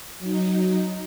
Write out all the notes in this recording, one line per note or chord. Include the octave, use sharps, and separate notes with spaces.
F#3 D#4